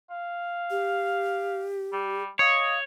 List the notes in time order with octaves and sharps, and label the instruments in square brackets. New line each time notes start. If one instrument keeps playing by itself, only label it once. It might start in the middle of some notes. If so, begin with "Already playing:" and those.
[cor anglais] F5
[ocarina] G4
[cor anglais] G3
[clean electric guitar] C#5 [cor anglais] D#5 [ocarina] F5